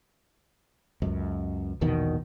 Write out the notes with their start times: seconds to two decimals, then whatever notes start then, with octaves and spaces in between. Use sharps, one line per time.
1.02 C#2 F#2
1.81 A#1 E2 B2 D#3